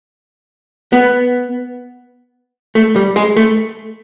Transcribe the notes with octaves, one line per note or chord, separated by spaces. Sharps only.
B3
A3
G3
G#3
A3